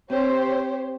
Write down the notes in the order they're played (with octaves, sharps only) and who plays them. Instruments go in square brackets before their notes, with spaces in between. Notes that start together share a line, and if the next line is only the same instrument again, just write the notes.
[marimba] C4 [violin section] G4 C5 C#5